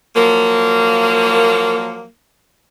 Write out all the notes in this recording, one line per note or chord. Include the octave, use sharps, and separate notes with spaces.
F3 F#3 A#3